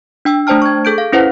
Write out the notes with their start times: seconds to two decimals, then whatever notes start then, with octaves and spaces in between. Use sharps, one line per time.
0.25 D4 G5 E6
0.47 A3 D4 C5 G5 A5 F6
0.62 C#6 G#6
0.85 G#4 A4 G6 D7
0.98 F5
1.13 C#4 E4 B4 C5 F#5